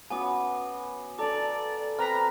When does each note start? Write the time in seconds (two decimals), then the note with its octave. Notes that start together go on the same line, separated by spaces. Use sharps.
0.10 B3 C#4 F#4 G#5 D6 D#6
1.19 D4 A4 D5 A#5 D6
1.99 C4 B4 A#5 C6 F6 F#6 B6